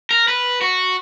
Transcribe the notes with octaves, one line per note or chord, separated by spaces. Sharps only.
A#4
B4
F#4